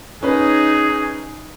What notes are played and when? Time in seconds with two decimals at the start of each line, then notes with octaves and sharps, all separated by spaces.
0.23 C#4 D#4 G#4 B4